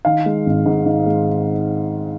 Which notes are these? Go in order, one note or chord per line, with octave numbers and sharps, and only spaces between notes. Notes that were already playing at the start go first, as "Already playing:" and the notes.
D#3 F5
G#3
G#1
G#2
D#3
G#3